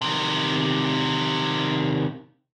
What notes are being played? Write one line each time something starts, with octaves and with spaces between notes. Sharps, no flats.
C3 D#3